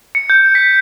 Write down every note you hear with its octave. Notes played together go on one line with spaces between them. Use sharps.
C#7
G6
B6